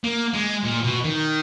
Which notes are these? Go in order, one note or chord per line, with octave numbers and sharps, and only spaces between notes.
A#3
G#3
A#2
B2
D#3